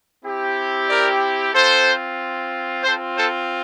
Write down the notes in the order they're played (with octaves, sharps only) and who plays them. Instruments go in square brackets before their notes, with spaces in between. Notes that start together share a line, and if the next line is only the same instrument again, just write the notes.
[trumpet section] C4 E4 G4
A#4 D5
C4 F4 A4 C5
C4 F4 A4 C5
A4 C5